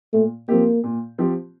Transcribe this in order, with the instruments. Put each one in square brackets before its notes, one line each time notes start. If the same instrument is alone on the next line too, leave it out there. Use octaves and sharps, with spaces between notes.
[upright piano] A#2 [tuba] A3
[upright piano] F3 C4 G4 [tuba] A#3
[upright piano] A#2
F3 C4 G4